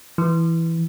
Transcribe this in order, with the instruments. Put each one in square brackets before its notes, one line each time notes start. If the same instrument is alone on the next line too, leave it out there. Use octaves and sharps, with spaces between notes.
[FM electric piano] E3